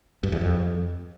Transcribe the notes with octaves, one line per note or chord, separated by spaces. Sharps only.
G2
E2
F2